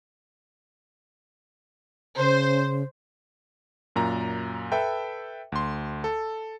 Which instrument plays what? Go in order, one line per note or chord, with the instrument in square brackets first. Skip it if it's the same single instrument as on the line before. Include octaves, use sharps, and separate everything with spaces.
[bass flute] C#3 [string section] C5
[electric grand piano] F#2 A#2 A#5
A4 B4 E5 G5
D2 C6
A4